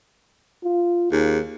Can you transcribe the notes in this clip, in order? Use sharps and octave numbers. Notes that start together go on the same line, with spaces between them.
F4
D#2 G#4